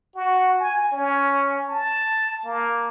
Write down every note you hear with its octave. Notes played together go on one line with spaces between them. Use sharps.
F#4
G#5
C#4
A5
A#3